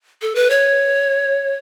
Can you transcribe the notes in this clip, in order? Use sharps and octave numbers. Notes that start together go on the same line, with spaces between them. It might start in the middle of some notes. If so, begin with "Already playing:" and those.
A4
B4
C#5